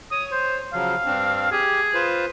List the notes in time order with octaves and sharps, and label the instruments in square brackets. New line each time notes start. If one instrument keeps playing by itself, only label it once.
[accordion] C#5 [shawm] D#6
[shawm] C5
[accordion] C#3 F3 F#3 [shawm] F5
[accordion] G2 C4 D4
[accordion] G4 [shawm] G#4
[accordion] F4 B4 C5